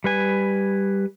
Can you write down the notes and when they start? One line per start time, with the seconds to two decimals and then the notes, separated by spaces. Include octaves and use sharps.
0.04 G3 B4 G#5